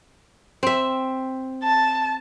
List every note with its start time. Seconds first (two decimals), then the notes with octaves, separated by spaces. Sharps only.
0.63 C4 E5
1.63 A5